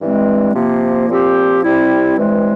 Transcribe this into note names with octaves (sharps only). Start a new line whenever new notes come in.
G2 E3 G#3 C4
C3 F3 A#3
A#2 F3 C4 G4 C5
C3 G3 C4 E4
G2 E3 G#3 C4